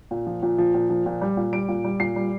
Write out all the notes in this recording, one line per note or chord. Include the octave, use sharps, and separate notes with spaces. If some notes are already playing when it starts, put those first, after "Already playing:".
A#2
F3
A#2
F3
A#2
F3
A#2
G3
A#2
G3 D7
A#2
G3
A#2 C7
G3